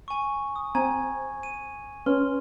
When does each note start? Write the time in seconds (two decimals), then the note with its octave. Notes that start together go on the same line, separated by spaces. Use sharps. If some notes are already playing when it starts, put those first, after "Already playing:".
0.08 G#5 C#6
0.56 D#6
0.75 C4 G#5 A#5 G#6
1.43 D#7
2.06 C#4 B4 C6